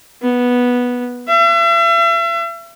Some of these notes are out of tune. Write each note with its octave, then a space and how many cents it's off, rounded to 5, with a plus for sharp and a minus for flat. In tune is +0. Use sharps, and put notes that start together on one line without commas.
B3 -10
E5 +40